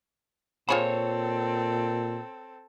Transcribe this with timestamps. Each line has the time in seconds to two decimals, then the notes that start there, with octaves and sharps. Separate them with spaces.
0.69 A#2 C4 F4 G#4 A4 C5 C#5 B5